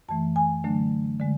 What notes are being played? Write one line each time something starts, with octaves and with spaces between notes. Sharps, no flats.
F#2 E3 A3 A5
G#5
D3 F#3 A3 D4
D3 G#3